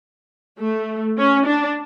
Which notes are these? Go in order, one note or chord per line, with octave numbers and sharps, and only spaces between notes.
A3
C#4
D4